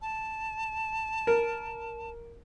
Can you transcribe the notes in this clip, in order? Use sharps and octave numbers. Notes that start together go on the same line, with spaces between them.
A5
A#4